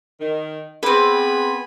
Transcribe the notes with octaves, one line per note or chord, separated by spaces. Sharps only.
D#3
B3 C4 G#4 B4 G#5 B5